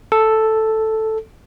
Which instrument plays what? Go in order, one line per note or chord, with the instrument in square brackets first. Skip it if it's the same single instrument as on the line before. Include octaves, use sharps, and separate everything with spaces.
[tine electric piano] A4